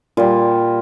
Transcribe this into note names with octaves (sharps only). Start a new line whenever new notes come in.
A#2 G3 F4